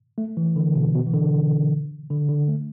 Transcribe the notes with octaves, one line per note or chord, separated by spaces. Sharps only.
A3
E3
D3
B2
B2
E3
D3
D3
D3
A3